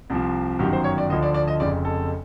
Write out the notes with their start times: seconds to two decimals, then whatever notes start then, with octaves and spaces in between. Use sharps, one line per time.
0.10 C2 C3 F3
0.59 G1 F#2 D#3 F#3 G4
0.73 C5
0.84 C#5
0.98 D5
1.10 D2 D3 F3 D#5
1.23 D5
1.34 D5
1.48 D#5
1.60 F1 F2 C#3 D5
1.85 A4